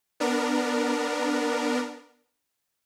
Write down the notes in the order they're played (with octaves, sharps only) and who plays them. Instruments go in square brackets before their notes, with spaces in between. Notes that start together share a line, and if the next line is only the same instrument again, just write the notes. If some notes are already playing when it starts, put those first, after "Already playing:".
[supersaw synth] B3 D4 A#4